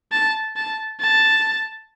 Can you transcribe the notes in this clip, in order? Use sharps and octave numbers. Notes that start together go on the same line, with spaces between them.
A5
A5
A5